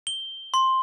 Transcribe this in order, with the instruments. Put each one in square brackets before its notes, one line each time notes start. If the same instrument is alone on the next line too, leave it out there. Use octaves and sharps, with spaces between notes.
[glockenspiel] G7
C6